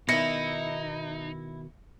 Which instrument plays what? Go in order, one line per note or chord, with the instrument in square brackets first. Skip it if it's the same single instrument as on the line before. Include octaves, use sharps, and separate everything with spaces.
[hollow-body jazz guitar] B2 D#3 [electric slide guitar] D#4 [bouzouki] E4 [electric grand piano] A#6 C#7